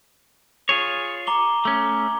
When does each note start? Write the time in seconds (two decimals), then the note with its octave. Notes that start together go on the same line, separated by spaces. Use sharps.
0.69 F4 G#4 C#5
1.27 A#5 D6 G7
1.65 A3 C#4